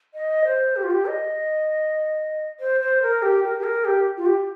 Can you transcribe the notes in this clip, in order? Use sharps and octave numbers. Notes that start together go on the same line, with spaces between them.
D#5
C5
G4
F4
G4
D#5
C5
C5
A#4
G4
A#4
G4
A#4
G4
F4
G4